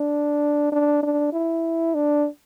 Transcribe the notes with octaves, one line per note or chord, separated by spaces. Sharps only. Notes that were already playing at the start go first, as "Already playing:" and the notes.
Already playing: D4
D4
D4
E4
D4